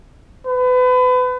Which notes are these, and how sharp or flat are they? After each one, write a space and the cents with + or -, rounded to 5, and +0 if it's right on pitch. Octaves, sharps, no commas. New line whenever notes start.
B4 +30